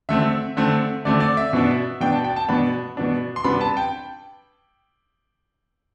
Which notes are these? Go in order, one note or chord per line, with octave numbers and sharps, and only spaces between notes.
D3 A3 C4 E5
D3 A3 C4
D3 A3 C4 D5
D5
E5
B2 B3 D4
B2 B3 D4 G5
A5
G5
A5
B2 B3 D4 B5
B2 B3 D4
C6
C3 G3 B3 D4 B5
A5
G5